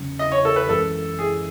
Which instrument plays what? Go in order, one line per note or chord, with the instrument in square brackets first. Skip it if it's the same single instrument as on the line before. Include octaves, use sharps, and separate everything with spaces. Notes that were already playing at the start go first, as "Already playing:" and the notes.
Already playing: [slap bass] E2 C#3 F#3 C#4
[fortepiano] D#5
C#5
A4
B4
[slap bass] F#2 E3 G#3 C#4 [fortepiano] A4
[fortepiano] G#4